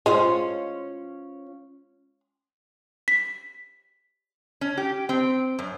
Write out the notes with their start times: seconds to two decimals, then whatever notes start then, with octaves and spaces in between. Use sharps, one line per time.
0.06 G#3 C#4 F4 C5
3.08 B6
4.61 C#4
4.77 G4
5.09 C4
5.59 F#2